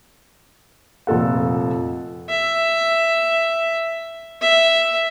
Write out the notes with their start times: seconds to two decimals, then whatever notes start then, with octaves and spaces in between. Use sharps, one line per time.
1.07 F1 A#2 A4 F#5
2.30 E5
4.41 E5